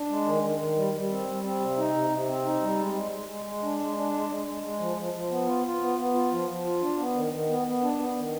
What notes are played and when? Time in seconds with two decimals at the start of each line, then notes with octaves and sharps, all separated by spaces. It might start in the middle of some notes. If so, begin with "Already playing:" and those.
Already playing: D4
0.09 G#3
0.25 D#3
0.43 D#3
0.59 D#3
0.77 G3
0.94 G3
1.10 C4
1.27 G3
1.44 C4
1.60 C3
1.77 D#4
1.95 C3
2.10 C3
2.28 C4
2.45 D#4
2.61 G3
2.79 G#3
2.95 G#3
3.12 G#3
3.28 G#3
3.45 G#3
3.63 D4
3.79 G#3
3.97 D4
4.13 G#3
4.29 G#3
4.47 G#3
4.63 G#3
4.79 F3
4.97 F3
5.14 F3
5.30 B3
5.47 F4
5.64 F4
5.81 B3
5.98 B3
6.14 F4
6.31 F3
6.49 F3
6.64 F4
6.81 D4
6.99 B3
7.15 D#3
7.33 D#3
7.48 B3
7.66 B3
7.82 D4
7.99 B3
8.17 D#3